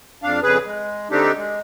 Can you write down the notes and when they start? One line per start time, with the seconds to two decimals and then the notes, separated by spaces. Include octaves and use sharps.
0.23 F2 D4 F5
0.43 F2 C#3 G#4 B4
0.65 G#3
1.11 D3 A3 C4 D4 D#4 G4
1.37 G#3